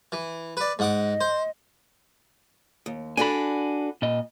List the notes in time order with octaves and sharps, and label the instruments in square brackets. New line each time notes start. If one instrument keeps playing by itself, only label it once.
[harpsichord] E3
B4 D5
[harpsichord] G#2 F#5 D6 [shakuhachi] D#5
[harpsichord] C5
[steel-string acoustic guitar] D#2
[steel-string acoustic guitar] D4 F#4 A4 [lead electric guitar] G#5 B5
[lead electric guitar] A#2 D#5